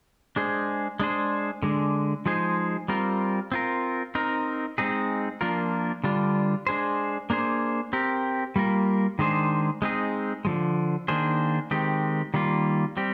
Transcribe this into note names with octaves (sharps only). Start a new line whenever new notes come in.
G#3 D4 G#4 C5
G#3 D4 G#4 C5
D3 G#3 D4
F3 G#3 D#4 G#4 C5
G3 C4 F4 A#4
C4 F4 A#4
C4 D#4 A#4
G#3 C4 D#4 G#4
F3 A#3 D4 F4 A#4
D3 G3 D4 F4
G#3 D4 G#4 C5
A#3 D4 G#4 C5
C4 G4 A#4
G3 A#3 F4 A#4
D#3 G#3 D4 G#4 C5
G#3 C4 D#4 G#4
D3 F3 G#3
D#3 A#3 D4 G#4 C5
D#3 G#3 C4 G4
D#3 G3 A#3 F4
G3 C4 G4